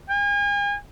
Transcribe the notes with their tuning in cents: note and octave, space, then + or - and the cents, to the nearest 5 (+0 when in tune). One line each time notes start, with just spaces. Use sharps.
G#5 -40